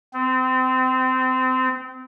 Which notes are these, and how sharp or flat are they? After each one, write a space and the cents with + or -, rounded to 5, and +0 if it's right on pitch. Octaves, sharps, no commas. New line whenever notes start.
C4 -25